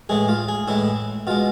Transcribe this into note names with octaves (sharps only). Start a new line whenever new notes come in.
A2 E3 G#3 G#4
F4
G#4
A2 E3 G#3 E4
B2 G#3 F4